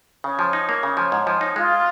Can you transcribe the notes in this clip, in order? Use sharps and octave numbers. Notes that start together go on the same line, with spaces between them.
C#3 C#5
F3
C#5
D#4
A#3 C#5
C#3
F3
G#2
F3
D#4
G#3 F4